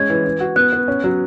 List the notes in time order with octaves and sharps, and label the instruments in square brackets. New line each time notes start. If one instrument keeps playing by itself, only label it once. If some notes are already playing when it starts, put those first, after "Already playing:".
Already playing: [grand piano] G#3 C#4 [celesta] G#6
[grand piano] E3
E3
F#4
[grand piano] B3 [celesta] F#6
[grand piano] B3
C#4
F#3